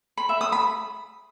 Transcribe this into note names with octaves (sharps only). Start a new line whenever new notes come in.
B5
E5
D#6
B5